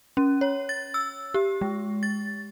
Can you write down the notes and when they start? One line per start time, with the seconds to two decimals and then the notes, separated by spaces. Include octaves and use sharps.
0.17 C#4
0.41 C#5
0.69 A6
0.94 E6
1.34 G4
1.61 G#3
2.03 A6